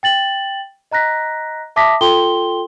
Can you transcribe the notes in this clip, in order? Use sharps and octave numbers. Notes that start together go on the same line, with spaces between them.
G5 A6 F#7
D#5 A#5 F#6 A#6 B6
E5 A5 D6 D#6 A#6 B6
F4 A4 G5 C6 G7